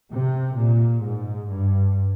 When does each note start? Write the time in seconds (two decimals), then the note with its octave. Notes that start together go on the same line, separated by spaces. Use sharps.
0.11 C3
0.57 A#2
1.03 G#2
1.49 G2